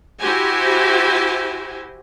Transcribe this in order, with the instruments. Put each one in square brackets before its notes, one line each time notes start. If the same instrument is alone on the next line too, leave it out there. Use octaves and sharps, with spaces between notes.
[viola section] E4 F#4 G4 C5 G#5